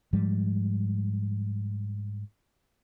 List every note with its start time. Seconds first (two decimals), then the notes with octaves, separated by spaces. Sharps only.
0.13 G#2 F3 G3 G#3